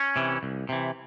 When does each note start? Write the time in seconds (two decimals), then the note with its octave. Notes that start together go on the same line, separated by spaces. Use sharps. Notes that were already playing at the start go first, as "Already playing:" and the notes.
Already playing: C#4
0.16 C3 E3
0.43 C2
0.69 C3 E3